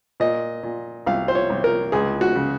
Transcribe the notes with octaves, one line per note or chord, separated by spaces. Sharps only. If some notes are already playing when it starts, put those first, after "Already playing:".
A#2 D#5
A#2
C2 F5
C5
C#5
C2
A#4
C#2 G#4
F#4
C#3